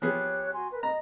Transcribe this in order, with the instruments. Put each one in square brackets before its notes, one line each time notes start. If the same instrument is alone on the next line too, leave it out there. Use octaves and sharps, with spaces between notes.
[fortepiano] F3 B3 G#4 [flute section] G4 C#5 F#6
[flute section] F#4 G#5 C6
A#4 B4
[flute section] D#5 [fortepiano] A#5